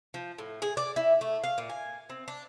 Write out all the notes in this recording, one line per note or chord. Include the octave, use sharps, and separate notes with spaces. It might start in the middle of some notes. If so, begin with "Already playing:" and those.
F3
A2
G#4
D5
E4
A3
F5
A#2
G#5
C4
D4